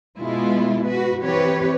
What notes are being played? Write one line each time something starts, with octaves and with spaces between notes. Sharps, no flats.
B2 G#3 E4 F4
F#4 B4
E3 C4 G4 B4 C#5